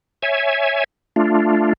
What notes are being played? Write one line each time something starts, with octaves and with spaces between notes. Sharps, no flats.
C#5 E5 G#5
A3 D4 F4